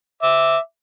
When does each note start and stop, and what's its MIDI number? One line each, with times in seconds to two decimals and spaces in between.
0.23 0.57 76
0.23 0.57 86